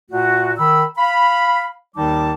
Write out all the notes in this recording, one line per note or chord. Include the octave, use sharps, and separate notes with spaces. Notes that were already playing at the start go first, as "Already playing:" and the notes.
A#2 A3 F#4
D#3 B5 E6
F5 B5
D#2 D#3 G3 D#4 A5 D6